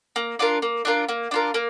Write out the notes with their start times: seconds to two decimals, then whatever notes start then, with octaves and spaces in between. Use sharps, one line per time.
0.16 A#3
0.39 D4 F4 A#4
0.62 A#3
0.85 D4 F4 A#4
1.09 A#3
1.31 D4 F4 A#4
1.54 A#3